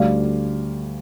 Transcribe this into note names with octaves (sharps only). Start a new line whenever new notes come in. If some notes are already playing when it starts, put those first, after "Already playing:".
Already playing: D2 D3 G3 D5 F5